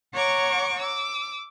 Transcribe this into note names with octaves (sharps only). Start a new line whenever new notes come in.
C#5 F#5 A#5 C#6 D6
D6 E6